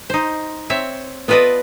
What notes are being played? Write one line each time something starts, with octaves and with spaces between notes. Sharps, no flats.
D#4 C5
C4 C#5 E5
B3 F4 A4 B4 D5 D#5